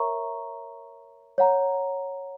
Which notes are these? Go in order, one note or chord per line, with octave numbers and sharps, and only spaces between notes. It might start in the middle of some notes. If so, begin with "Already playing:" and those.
Already playing: A#4 C#5 E5 A#5 C#6
C#5 F#5 A#5